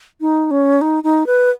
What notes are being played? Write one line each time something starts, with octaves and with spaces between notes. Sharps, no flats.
D#4
C#4
D#4
D#4
B4